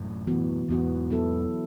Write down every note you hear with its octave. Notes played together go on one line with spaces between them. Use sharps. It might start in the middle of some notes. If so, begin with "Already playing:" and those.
Already playing: F#2 A2
E3 B3 F#4
E2 G#2 E3 B3 F#4
F#3 B3 E4 A4